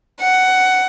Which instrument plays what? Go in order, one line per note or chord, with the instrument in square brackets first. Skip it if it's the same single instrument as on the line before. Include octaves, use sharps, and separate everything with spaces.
[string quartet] F#5